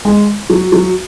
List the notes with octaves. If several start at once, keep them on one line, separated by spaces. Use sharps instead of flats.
G#3
F#3
F#3